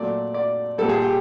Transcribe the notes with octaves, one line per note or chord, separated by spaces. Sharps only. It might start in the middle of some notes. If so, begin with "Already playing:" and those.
Already playing: A#2 F#3 A3 D5
D5
A#2 G3 A4
G#4
G4